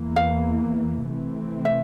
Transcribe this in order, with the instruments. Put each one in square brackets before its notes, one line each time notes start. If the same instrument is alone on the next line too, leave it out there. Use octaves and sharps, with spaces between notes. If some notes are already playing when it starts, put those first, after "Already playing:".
Already playing: [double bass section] E2 E3 A#3
[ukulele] F5
[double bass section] C3 E3 A3 C4
[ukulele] E5